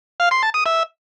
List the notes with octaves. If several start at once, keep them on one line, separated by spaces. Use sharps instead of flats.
F5
C6
A5
D#6
E5